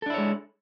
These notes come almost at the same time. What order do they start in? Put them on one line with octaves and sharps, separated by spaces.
A4 D4 E4 C#5 G#3